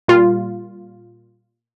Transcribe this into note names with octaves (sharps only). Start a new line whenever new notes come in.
A#2 G3 F4